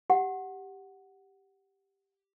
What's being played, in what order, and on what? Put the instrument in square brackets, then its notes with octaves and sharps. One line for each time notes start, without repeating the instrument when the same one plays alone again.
[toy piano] G4 F#5